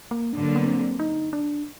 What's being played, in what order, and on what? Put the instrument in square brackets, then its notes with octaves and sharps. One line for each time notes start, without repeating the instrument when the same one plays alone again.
[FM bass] A#3
[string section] G2 D3 F#3 A#3 [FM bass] D4
[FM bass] B3
C4
D#4
D4